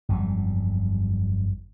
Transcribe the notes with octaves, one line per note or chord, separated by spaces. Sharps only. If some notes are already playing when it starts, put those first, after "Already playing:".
G1 F2 F#3 G3